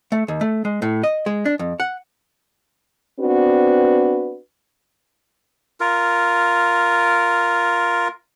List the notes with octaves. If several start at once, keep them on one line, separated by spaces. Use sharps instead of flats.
A3
D#2
A3
G#3
A2
D#5
G#3
D4
F2
F#5
B3 C4 D4 F#4 B4
F4 A#4